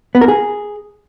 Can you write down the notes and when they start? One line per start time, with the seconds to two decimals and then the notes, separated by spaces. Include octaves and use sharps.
0.15 B3
0.21 A#4
0.28 G#4